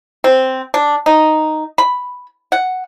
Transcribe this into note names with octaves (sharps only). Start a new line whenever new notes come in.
C4
D4
D#4
B5
F#5